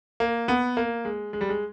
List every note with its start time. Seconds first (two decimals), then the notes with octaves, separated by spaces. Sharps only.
0.20 A#3
0.48 B3
0.77 A#3
1.05 G#3
1.33 G#3
1.41 G3
1.49 G#3